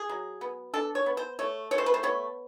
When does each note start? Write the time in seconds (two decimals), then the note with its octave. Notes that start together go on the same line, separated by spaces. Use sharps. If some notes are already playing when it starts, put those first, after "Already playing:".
Already playing: G#4
0.09 F#3
0.41 B3
0.74 D4 A4
0.95 C#5
1.06 B3
1.17 C5
1.39 A3 C#5
1.71 A3 C#5
1.78 C5
1.86 B4
1.94 C5
2.03 B3 C#5